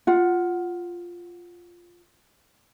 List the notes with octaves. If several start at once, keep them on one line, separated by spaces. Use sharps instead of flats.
F4 F#5